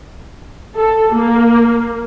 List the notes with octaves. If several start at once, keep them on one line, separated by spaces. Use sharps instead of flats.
A4
A#3